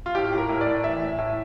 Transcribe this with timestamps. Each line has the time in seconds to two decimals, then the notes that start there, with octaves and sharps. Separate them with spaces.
0.06 F4
0.14 A2 G4
0.32 A2
0.38 A#4
0.49 A2
0.61 D5
0.66 A2
0.84 E3 E5
1.01 A2
1.18 A2